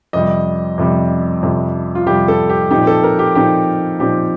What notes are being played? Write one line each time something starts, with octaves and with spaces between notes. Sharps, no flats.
F2 C3 G3 D#5
F2 C3 G3
F2 C3 G3
F4
F2 C3 G3 G4
A4
G4
A#2 F3 C4 D#4 G4
A4
A#4
G4
A#2 F3 C4 D#4 G4
A#2 F3 C4 D#4 G4